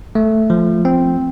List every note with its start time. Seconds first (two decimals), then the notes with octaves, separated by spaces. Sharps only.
0.15 A3
0.50 F3
0.85 C4